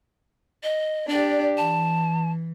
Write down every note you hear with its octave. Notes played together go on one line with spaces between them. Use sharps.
D#5
D4 G4 D5
E3 A5